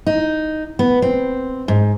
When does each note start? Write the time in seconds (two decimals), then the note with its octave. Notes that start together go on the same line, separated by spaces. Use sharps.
0.06 D#4
0.79 B3
1.02 C4
1.68 G#2